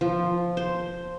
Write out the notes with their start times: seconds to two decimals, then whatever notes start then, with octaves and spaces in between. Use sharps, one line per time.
0.01 F3
0.57 C5